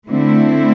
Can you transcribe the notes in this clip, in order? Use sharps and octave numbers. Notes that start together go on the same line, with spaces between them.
D3 A3 C4 E4